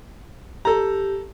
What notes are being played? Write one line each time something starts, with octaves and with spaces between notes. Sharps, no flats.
G4 A4 A#5